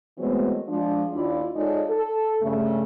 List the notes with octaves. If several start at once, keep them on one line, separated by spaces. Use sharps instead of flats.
E3 F#3 G#3 A3 B3 C4
F3 G#3 D4
D#2 D4 E4 F4 D5
G#3 D#4 F4 A4 C#5 D5
A4
G2 C#3 A3